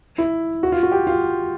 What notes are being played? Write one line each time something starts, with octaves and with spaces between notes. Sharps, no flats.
E4
F#4
F4
F#4
G4
F4